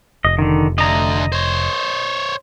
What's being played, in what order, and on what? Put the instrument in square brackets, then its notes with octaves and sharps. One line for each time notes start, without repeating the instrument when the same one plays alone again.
[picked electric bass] F1 [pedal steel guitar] D#5
[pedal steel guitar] D3 D#3
[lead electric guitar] D2 D3 [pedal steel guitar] D#5 A#5
[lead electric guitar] C5 C#5